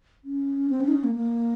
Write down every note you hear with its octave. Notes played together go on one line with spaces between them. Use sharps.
C#4
C4
C#4
D#4
C#4
A#3
A#3